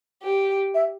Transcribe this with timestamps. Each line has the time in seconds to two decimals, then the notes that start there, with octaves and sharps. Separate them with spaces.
0.23 G4
0.75 E5